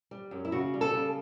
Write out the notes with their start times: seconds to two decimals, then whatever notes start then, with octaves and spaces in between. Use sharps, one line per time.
0.11 G3
0.31 F#2
0.45 E4
0.52 C#3 F#4
0.74 G3
0.81 A4
0.94 C#3